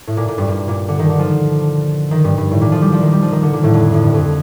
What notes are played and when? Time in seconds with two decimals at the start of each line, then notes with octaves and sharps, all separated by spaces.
0.07 A2
0.17 A#2
0.28 A#2
0.38 G2
0.48 G2
0.68 A#2
0.88 D3
0.99 D#3
1.10 D3
1.19 F3
2.11 D#3
2.24 G2
2.38 G2
2.51 A2
2.61 A#2
2.72 F3
2.82 G3
2.92 F3
3.02 D#3
3.12 G3
3.22 F3
3.32 D#3
3.42 D3
3.53 A#2
3.63 A2
3.74 F2
3.94 A2
4.04 G2
4.14 F2